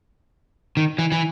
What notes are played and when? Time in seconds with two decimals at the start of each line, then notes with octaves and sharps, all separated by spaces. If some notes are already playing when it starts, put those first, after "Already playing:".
0.77 D#3
0.98 E3
1.12 E3